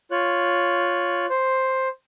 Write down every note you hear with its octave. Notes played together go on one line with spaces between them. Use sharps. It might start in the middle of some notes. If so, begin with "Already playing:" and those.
F4 C#5 F#6
C5